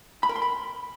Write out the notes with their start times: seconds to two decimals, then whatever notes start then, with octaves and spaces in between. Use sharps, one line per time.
0.23 B5
0.29 A#4
0.36 C6
0.42 B5